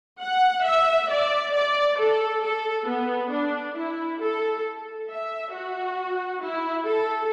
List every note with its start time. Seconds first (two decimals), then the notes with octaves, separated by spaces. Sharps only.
0.20 F#5
0.64 E5
1.09 D5
1.53 D5
1.97 A4
2.42 A4
2.87 B3
3.31 D4
3.75 E4
4.20 A4
5.09 E5
5.53 F#4
6.42 E4
6.87 A4